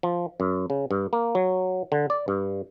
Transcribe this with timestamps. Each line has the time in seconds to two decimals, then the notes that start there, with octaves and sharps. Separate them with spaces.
0.03 F3
0.40 F#2
0.70 C#3
0.91 G2
1.13 A#3
1.35 F#3
1.92 D3
2.10 D5
2.28 G2